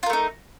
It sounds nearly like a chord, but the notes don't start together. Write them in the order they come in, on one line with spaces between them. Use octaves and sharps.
F4 A#4 A3 D#4